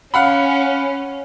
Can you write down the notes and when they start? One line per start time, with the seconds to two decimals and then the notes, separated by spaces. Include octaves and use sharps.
0.14 C#4 F5 F#5 B5